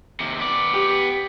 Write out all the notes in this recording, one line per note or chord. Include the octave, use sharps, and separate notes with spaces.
D#2 C3
B3 D5
G4